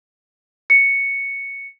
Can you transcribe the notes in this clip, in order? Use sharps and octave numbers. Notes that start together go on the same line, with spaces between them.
C#7